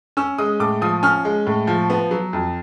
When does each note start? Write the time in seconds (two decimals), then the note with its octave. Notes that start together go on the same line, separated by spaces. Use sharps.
0.17 C#4 E6
0.38 G#3 D#6
0.60 A2 D6
0.82 F3 D#6
1.03 C#4 F6
1.25 G#3
1.47 A2
1.67 F3
1.90 B3
2.11 F#3
2.33 F2